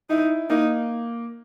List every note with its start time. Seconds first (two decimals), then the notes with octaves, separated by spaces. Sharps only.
0.10 D#4 E4
0.50 A#3 D#4